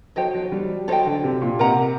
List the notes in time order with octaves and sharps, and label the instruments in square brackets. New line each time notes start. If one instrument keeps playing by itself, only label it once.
[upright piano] F#3 [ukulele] A4 C5 D#5 G5
[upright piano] F#3
G3
[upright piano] F#3 [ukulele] A4 C5 D#5 G5
[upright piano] D3
C3
A#2
[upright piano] C3 [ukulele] A#4 D#5 F#5 A#5